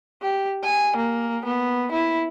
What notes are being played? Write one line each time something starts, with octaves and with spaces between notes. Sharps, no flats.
G4
G#5
A#3
B3
E4